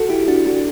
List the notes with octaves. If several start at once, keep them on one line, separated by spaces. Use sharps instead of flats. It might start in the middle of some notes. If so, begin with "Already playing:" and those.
Already playing: F#4 A4
E4 G4
D4 F#4
D4 F#4